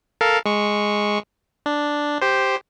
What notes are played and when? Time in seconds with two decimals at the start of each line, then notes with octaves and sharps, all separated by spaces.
0.21 A4 A#4 F5
0.46 G#3 C#6
1.66 D4
2.21 G4 C5